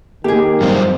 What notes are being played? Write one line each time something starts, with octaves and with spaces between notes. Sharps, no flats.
D#3 A#3 G4 G#4
F#2 G3 C4